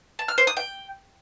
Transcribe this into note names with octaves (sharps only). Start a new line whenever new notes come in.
A5
F6
C5
D#6
G5